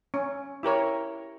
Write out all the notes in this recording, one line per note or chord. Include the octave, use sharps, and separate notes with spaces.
C#4
E4 G4 A#4 C#5